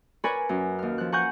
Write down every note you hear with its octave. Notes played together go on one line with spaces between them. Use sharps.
A#4 B4 C#5 D5 G#5 B5
F#2 C#4
D#2 F6
F3 F#6
F#5 G#5 A#5 C#6 F#6 G6